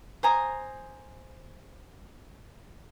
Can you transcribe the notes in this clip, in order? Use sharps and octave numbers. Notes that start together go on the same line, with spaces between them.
C5 G#5 A#5 D#6